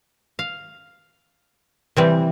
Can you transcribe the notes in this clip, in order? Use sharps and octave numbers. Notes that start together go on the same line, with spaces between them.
F5
C3 E3 G3 C4